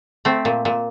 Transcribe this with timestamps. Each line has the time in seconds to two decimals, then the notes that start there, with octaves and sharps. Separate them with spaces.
0.25 A3 C4
0.45 A#2
0.65 A#2